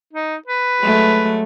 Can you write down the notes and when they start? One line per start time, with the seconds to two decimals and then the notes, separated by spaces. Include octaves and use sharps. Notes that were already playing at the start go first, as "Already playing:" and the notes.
0.13 D#4
0.47 B4
0.80 F#3 G#3 A3